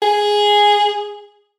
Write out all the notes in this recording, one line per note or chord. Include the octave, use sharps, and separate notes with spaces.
G#4